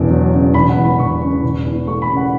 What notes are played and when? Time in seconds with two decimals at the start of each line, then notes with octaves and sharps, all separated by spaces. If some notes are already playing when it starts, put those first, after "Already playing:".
Already playing: E1 E2 C#3
0.10 F#3
0.32 C#3
0.54 E1 B5
0.69 F#5
0.76 E2
0.84 B5
0.99 E1 C#6
1.21 C#3
1.43 E1
1.65 E2
1.87 A3 C#6
2.02 B5
2.09 C#3
2.17 F#5